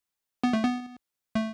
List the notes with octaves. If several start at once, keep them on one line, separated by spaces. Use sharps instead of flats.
B3
A3
B3
A3